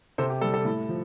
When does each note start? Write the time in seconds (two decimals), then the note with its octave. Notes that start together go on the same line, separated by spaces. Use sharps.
0.18 C3 A4 C5
0.30 G4
0.41 G3 A4
0.54 A4
0.65 A2
0.89 F3